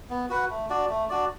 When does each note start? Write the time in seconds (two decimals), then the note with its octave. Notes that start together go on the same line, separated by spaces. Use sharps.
0.10 B3
0.29 F#4 B4 F#5
0.50 A3
0.70 D4 F#4 D5
0.89 A3
1.10 D4 F#4 D5